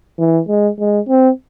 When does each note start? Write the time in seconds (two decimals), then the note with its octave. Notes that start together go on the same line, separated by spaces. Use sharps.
0.19 E3
0.48 G#3
0.79 G#3
1.09 C4